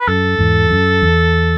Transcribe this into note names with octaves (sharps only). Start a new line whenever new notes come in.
B4
F#2 A4
E2 G#2
F#2
E2